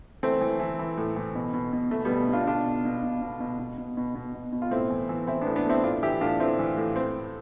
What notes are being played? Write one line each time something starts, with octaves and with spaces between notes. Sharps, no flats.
E3 A3 C4
E3
E3
E3
A2
E3
B2
B2
B2
B2 A3
G3 B3
B2
B2 D4 F4
B2 D4 F4
B2
B2
B2
B2
B2
B2
B2
B2
B2
B2
B2
F4
A2 C4 E4
E3
E3
E3 C4 E4
B3 D4
A2
B3 D4
A2 C4 E4
A2 D4 F4
E3 E4 G4
A2 D4 F4
A2 C4 E4
E3
A2
C4